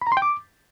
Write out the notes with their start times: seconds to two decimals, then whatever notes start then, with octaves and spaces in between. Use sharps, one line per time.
0.02 B5
0.07 A#5
0.12 C6
0.17 G5
0.22 D6